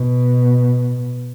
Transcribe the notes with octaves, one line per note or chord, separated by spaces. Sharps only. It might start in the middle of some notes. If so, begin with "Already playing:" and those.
Already playing: B2